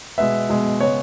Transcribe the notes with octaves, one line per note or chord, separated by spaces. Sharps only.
B2 G#3 B3 E5
B2 G#3 B3
C#3 G#3 B3 C#5